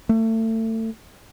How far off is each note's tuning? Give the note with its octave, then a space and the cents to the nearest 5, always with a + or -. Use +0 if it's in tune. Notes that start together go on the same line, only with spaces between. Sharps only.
A3 +30